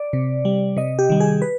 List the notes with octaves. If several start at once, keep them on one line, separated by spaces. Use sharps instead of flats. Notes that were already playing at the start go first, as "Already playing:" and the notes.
Already playing: D5
C3
G3
C3 D#5
G4
D#3 G3
G#4
B4